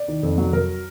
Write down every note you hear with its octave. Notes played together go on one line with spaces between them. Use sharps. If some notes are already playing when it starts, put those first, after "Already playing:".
Already playing: D5
D#3
F2
F#3
F#3 A#4